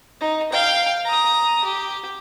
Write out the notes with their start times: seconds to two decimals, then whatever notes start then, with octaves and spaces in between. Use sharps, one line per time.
0.21 D#4
0.52 F5 G5
1.05 A#5 D#6
1.64 G4